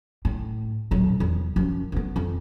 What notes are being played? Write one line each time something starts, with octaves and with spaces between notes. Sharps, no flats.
A2
D#1 F#3
E2
F#2 F3
G2 B3
F2